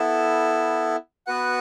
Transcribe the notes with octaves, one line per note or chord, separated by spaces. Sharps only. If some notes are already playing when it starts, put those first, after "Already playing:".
Already playing: B3 E4 A4
B3 F#4 B4 F#5